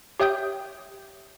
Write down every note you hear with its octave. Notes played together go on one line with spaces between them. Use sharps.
G4 C#5 E5 G5 D#6 G6